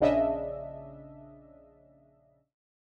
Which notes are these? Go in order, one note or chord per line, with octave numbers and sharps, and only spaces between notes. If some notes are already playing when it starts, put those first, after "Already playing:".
A#1 C#3 D4 D#5 E5